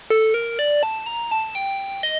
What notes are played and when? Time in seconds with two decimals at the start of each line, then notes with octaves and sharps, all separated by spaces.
0.10 A4
0.34 A#4
0.59 D5
0.83 A5
1.06 A#5
1.32 A5
1.55 G5
2.03 D#5